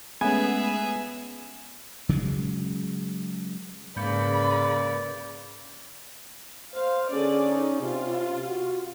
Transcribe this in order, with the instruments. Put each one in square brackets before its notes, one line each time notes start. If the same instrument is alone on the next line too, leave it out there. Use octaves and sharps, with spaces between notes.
[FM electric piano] G#3 A3 C#4 [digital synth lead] B3 [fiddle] G#4 E5 [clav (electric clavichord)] G#5
[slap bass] C#3 F#3 G#3
[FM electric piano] G#2 G6 C#7 [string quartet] C#3 B4 [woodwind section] A#3 D5 [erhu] B5
[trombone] C5 [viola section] F5
[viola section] D3 G#4 D5 [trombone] C#4
[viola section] D#4
[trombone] C3 [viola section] F4
[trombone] F#4